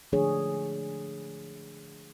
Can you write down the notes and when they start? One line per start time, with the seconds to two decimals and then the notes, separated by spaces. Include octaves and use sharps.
0.12 D3 F3 A3 D4 G#4 C#5